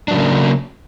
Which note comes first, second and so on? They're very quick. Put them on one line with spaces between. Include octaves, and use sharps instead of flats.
D4 F#3 C#3 A#3